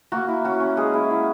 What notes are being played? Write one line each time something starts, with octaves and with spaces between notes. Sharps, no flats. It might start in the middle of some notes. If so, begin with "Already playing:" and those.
A#3 F#4
E4
C#4 F#4
C#4
G#3 G#4
E4
E4